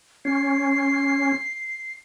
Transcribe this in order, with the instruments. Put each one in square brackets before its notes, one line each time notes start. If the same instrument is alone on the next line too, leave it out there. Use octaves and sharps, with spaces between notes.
[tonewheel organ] C#4 [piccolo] C7